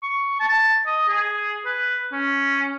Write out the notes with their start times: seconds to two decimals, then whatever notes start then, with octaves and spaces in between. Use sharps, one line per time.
0.03 C#6
0.40 A5
0.86 D#5
1.09 G#4
1.65 B4
2.12 C#4